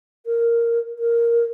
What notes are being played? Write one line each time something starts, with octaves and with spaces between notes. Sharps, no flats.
A#4
A#4